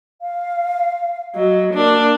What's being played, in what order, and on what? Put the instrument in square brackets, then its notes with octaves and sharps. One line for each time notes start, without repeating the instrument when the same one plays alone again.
[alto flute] F5
[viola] F#3 [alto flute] D#5
[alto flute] A#3 [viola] D4